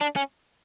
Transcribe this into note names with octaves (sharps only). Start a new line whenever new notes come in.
D4
C#4